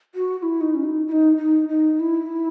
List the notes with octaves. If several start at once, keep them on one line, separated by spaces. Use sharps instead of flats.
F#4
F#4
E4
D#4
C#4
D#4
E4
D#4
D#4
D#4
E4